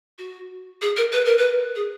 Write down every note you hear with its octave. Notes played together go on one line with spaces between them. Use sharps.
F#4
G#4
A#4
B4
A#4
B4
G#4